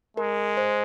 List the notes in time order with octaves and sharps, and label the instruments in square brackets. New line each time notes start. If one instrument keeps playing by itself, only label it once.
[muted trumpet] G#3 [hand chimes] A#4
[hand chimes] C5